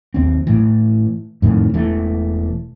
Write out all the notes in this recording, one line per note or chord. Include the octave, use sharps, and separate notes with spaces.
D#2 C4
A2 E3
F2 A2 D#3
E1 E3 A3